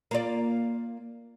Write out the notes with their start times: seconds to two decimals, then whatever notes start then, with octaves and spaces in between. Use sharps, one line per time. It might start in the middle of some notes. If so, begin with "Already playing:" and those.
0.11 A#3 F4 D5